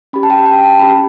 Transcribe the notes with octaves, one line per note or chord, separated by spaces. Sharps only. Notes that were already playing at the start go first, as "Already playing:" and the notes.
C#4 G4 B5
A5
G5
G5
A5
C#4 G4 B5